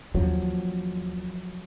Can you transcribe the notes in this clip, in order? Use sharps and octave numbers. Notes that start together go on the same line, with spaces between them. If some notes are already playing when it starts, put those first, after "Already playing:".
D#2 F3 F#3 C#4